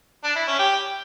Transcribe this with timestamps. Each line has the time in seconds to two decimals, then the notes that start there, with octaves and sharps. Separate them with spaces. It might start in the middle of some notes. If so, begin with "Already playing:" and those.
0.24 D4
0.36 E4
0.47 C#4
0.59 G4